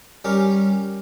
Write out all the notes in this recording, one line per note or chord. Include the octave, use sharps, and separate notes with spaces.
G3 C#4 G4 A#4